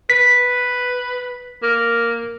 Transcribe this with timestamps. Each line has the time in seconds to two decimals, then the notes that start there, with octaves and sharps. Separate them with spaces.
0.10 B4 B6
1.63 A#3